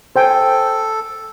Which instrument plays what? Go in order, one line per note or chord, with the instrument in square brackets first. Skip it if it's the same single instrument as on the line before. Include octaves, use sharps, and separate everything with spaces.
[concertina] A4 [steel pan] C5 G5 G#5